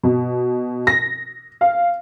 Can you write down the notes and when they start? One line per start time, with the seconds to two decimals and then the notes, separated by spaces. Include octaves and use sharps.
0.03 B2
0.87 A#6
1.61 F5